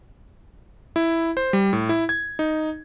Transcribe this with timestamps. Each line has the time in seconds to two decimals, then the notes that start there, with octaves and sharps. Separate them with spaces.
0.96 E4
1.37 C5
1.53 G3
1.73 A2
1.89 E4
2.09 G#6
2.39 D#4